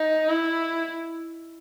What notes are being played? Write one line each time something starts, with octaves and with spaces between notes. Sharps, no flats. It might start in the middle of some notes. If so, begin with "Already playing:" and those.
Already playing: D#4
E4